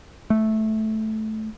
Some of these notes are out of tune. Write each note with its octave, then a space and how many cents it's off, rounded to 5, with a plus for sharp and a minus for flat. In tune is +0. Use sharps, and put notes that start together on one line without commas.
A3 -10